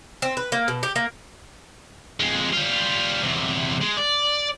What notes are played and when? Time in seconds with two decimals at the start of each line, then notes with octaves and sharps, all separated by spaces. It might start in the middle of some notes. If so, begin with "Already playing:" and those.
0.22 C4
0.37 B4
0.52 A#3
0.68 B2
0.83 G4
0.96 A#3
2.20 F2 G#3
2.53 G3 F4
3.23 E2 C3
3.81 G#3
3.97 D5